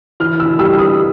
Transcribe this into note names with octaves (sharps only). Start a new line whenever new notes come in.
E3 F6
E6
G3 E6
D#6